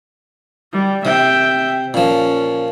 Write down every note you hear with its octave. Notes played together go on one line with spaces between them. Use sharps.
G3
C3 E5 G5
A#2 F3 C#4